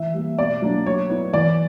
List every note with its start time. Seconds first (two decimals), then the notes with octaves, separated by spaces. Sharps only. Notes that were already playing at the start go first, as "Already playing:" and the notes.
Already playing: E3 E5
0.14 G3 A#3
0.38 B2 D5
0.62 F#3 A#3 D4
0.86 F#3 C#5
1.10 B3 E4
1.33 E3 D5